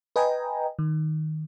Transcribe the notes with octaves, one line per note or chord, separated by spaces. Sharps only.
B4 D#5 G5 G#5 A#5
D#3